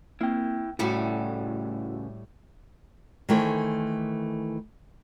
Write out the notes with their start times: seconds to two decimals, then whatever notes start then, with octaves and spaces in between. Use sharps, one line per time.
0.21 A#3 C4 E4 G5
0.79 A2 C#3 G3 A3 E4 F#4 A4 F#5
3.29 D#3 E3 A3 G#4 C5 C#5